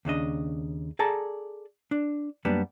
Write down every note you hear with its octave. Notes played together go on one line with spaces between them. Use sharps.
D#2 C#3 D4 D#5
G#4 A4 D5 A5 A#5
D4
F#2 G3 A#3 B3 D4